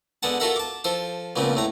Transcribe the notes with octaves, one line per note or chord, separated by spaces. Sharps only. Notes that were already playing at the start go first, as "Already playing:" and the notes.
D3 G#3 B3 F#5 A5
F4 F#4 A4 A#4 E5 F#5
A5 D6
F3 A4 C5
C#2 A#2 C#3 F3 B3 C4
A2 A3 A#5